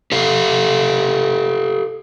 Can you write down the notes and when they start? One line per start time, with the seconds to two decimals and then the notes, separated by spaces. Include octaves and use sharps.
0.12 G4 A4 F5